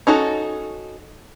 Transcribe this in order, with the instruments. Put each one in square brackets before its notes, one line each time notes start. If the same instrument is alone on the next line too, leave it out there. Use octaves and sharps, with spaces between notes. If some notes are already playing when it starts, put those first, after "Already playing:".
[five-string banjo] C#4 D#4 F#4 A4